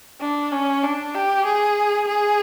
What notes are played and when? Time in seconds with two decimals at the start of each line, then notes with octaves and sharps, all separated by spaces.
0.21 D4
0.52 C#4
0.83 D4
1.14 G4
1.45 G#4
2.08 G#4